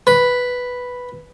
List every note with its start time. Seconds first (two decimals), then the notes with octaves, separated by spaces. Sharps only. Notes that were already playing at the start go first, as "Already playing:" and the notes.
0.07 B4